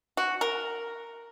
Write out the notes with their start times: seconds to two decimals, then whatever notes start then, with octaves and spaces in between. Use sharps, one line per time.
0.17 F#4
0.41 A#4